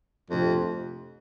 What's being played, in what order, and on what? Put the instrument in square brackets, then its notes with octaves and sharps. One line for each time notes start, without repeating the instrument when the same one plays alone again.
[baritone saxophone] F2 [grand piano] C3 F3 A3 D4 G4